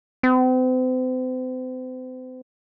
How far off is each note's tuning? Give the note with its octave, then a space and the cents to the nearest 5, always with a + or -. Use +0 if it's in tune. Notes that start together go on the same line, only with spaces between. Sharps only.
C4 -40